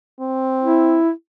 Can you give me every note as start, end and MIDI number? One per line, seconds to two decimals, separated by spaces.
0.20 0.99 60
0.63 1.10 64